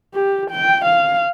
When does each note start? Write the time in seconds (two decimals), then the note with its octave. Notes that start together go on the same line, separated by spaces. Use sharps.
0.14 G4
0.51 G5
0.85 F5